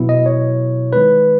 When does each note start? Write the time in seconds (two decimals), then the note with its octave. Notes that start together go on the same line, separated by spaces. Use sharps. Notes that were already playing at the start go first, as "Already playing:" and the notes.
Already playing: B2 F#3 B3 E4
0.09 D#5
0.26 C#5
0.92 D#3 G#3 D#4 B4